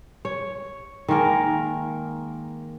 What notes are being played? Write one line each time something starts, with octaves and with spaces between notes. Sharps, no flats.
C#5
D#3 G#3 A#3 A#4